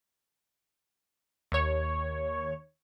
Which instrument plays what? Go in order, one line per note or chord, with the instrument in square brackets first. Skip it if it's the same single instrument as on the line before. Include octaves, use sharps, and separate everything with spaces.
[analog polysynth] D#2 C#5